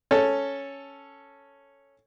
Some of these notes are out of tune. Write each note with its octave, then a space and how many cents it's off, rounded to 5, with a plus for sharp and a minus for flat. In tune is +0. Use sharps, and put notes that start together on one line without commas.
C#4 +0 A4 +0